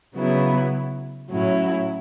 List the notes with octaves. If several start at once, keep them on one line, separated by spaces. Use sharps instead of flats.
C#3 F#3 B3 E4
A2 F#3 C#4 E4